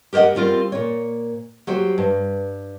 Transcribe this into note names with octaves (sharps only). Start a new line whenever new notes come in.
G4 A#4 C5 D#5 F#5
G3 C4 F4 A#4
A#2 C#5
F#3 F#4 G4 C5
G2